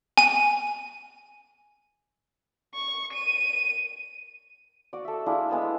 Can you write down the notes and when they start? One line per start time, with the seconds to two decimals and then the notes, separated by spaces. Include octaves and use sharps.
0.18 G#5 D#7
2.74 C#6
3.13 D#7
4.93 F#4 D5
5.05 A4 E5
5.26 D4 E4 F4 G#4
5.49 G#3 B3 A5